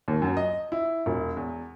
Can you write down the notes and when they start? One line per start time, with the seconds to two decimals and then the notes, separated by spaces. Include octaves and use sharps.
0.08 D#2
0.22 F#2
0.37 D#5
0.72 E4
1.06 E1
1.37 E2